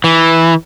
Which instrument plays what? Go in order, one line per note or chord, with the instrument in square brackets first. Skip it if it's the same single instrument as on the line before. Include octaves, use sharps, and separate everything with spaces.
[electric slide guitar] E3